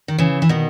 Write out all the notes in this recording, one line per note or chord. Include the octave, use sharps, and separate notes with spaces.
D#3
C#3 E3
E3
B2 D#3